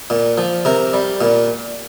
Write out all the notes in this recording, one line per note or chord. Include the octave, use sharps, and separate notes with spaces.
A#2
F3
C3 A#4
G3
A#2